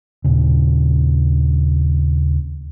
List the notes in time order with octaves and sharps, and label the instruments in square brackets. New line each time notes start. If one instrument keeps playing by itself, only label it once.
[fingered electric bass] D#2 A#2 C#3